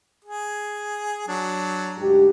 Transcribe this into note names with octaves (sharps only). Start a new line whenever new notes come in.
G#4
F#3 D4
D2 G#2 G4